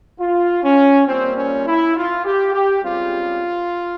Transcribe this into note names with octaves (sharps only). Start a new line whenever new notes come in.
F4
C#4
A#2 G3 A#3 C4
C#4
E4
F4
G4
G4
C#2 C#3 G3 C4 F4